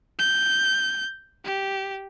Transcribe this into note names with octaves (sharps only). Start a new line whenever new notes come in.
G6
G4